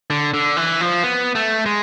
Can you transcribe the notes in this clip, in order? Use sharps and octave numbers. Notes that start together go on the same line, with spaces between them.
D3
D3
E3
F3
B3
A3
G#3